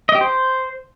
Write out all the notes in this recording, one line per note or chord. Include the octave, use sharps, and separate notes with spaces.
D#5
G4
C5